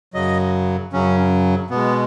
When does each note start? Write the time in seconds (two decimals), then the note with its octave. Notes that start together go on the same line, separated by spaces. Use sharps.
0.14 F#2 C#3 F#3 D#5
0.93 F#2 C#3 F#3 C#4
1.70 B2 G#3 B3